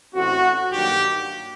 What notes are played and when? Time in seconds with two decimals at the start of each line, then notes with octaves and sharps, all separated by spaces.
0.14 A1 A2 A3 C4 F#4
0.72 G2 D#3 F#3 A#3 G4